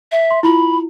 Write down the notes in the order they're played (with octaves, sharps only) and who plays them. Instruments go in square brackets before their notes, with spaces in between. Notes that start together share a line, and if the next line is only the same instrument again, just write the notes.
[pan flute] E5
[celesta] C6
[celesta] E4 F4 [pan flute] B5